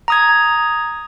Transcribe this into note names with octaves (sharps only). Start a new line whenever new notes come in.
A#5 D#6 G#6